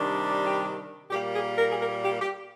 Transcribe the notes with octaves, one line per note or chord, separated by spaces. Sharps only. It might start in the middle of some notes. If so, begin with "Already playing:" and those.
Already playing: C3 D#3 G3 D4
G4
A#2 G3 A#3 G4
G#4
A#4
G#4
A#4
G4
G4